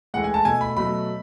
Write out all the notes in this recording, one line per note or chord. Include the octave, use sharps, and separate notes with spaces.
A2 E3 G#3 F#5
G#5
A5
B2 A3 G#5
B5
B2 F#3 A3 B5